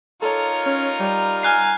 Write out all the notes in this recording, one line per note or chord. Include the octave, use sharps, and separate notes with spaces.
D#4 F4 A4 A#4 C#5
C#4
G3
G#5 F6 F#6 C7